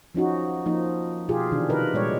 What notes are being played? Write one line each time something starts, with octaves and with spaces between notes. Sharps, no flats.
F3 C#4 D#4 F#4
F3 A#3 D#4
B2 F4 G4 G#4
C3 D#3 E3 D4
C3 D#3 A#4 B4 D#5
A#2 G3 G#3 C#5 D5